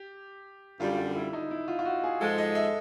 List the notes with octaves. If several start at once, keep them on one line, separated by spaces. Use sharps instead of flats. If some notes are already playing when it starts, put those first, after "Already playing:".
Already playing: G4
F#2 D3 G3 F4
F4
E4
D#4
E4
F4
F4
F#4
G#4
G#2 F3 G#3 A4
D#5
E5